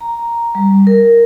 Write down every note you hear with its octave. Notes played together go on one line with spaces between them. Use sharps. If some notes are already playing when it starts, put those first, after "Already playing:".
A#5
G3
A#4